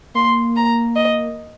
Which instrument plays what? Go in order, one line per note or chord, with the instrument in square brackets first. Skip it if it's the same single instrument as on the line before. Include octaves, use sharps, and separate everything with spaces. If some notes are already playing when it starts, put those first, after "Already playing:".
[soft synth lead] A#3 [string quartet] C6
[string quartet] A#5
D#5